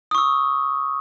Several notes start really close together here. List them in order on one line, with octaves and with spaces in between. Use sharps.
D#6 C#6 E6